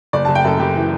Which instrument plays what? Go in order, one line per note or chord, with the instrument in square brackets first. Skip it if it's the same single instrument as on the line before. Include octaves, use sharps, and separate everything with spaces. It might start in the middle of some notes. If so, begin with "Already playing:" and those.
[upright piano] F#1 D5
F#1 A5
G5
F#2 A4
F#1 G4
E3